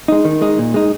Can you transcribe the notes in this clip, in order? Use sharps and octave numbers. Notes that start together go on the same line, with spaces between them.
G#3 D#4
D#3
G#3 D#4
A#2
G#3 D#4